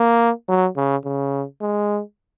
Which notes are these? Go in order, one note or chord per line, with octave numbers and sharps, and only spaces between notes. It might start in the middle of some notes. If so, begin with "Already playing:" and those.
Already playing: A#3
F#3
C#3
C#3
G#3